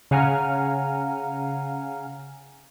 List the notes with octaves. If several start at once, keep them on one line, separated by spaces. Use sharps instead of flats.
C#3 F5 F#5 G#5 A#5 F6